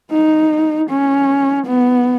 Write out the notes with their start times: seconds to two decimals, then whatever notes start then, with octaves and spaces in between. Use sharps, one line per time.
0.12 D#4
0.89 C#4
1.66 B3